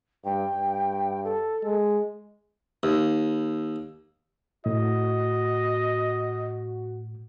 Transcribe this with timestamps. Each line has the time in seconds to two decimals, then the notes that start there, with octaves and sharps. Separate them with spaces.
0.25 G2 G5
0.55 G2
1.24 A4
1.64 G#3
2.83 D#2
4.66 A2 F#4 D#5